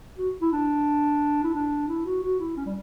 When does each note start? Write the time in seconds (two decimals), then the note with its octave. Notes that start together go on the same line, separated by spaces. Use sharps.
0.18 F#4
0.41 E4
0.52 D4
1.44 E4
1.55 D4
1.88 E4
2.06 F#4
2.23 F#4
2.40 E4
2.57 C#4
2.66 G3